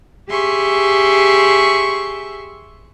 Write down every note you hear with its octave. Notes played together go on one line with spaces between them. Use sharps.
G4 G#4 E5 C6 C#6